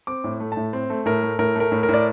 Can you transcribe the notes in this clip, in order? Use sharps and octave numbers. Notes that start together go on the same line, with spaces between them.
C4 D6
A2
A3
A2 A5
C4
A3
A2 A#4
A3
A2 A#4
A3 A#4
A2
A#4
A2
D5